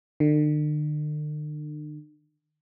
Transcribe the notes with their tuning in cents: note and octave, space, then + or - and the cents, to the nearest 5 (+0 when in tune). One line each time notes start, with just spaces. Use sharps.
D3 +45